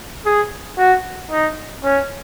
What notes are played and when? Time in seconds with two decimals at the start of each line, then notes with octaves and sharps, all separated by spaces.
0.25 G#4
0.78 F#4
1.31 D#4
1.83 C#4